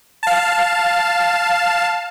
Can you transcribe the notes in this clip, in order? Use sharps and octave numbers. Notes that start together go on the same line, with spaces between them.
F5 A5